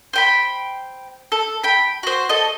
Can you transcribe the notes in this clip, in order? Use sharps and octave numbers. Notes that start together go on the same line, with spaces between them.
C5 G5 B5
A4
G5 B5
F#4 C5
A4 D#5